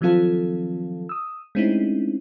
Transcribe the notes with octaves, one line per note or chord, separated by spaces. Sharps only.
D#3 F3 F#3 C4 F4 A4
D#6 E6
G#3 A3 C4 C#4 D#4 E4